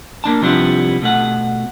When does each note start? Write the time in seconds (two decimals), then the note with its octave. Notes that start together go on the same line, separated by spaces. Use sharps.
0.24 A#3 D4 A5
0.42 C3 F3 G3 B3 D4 E4
1.02 B2 A3 F#5